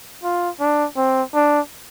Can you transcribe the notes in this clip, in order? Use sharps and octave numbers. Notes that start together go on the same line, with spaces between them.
F4
D4
C4
D4